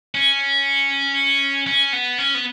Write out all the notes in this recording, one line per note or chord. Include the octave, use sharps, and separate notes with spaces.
C#4
C#4
B3
C#4
B3